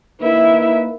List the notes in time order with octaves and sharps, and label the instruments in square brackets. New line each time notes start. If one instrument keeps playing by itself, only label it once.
[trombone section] A#3 D#4 B4 [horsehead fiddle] E4 E5